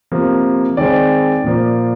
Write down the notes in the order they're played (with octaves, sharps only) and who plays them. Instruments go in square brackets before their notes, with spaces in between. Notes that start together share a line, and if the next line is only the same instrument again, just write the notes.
[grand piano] C3 F3 A#3
D#3 G#3 C4 D5
A#2 F3 A#3